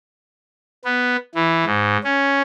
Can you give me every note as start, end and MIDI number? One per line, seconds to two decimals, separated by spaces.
0.85 1.16 59
1.35 1.65 52
1.66 1.97 44
2.04 2.42 61